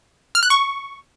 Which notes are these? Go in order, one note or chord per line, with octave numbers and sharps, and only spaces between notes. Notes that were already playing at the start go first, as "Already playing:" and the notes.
F6
F#6
C#6